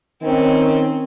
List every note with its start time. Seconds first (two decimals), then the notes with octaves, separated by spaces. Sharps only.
0.22 D#3 C4 C#4